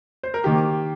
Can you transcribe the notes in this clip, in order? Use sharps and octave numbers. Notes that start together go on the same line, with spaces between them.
C5
A#4
D#3 A#3 G4